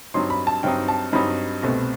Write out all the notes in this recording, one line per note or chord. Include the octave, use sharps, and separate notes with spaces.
G2 F#3 C4 D#4 C6
B5
A5
G2 F#3 C4 D#4 G5
A5
G2 F#3 C4 D#4 B5
C2 B2 A3 C4